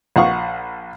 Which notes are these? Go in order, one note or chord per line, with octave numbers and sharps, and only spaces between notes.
A#1 F5 F#5 C#6